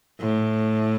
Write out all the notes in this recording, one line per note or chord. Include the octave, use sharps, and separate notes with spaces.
A2